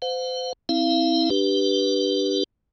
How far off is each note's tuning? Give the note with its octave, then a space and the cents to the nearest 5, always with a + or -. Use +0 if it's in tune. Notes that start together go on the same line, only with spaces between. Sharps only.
C5 -35 F5 +45
C4 +0 E4 -30 F5 -30
D4 +10 G4 +0 B4 -10